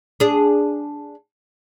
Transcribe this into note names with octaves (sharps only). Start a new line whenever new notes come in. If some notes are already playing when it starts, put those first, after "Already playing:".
D4 G#4